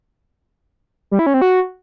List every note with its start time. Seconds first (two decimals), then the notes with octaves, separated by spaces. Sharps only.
1.11 G3
1.19 E4
1.26 C#4
1.34 C4
1.41 F#4